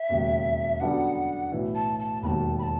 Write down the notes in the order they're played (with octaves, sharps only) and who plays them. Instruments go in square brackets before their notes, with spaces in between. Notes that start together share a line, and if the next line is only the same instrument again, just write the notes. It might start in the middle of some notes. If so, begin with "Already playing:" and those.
Already playing: [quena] E5
[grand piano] E1 D#2 C#3
[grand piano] F#2 D3 G3 B3 D4 [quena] F#5
[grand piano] B1 A2 E3
[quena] A5
A5
[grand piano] E1 D#2 D#3 [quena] A5 B5
[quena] B5
A5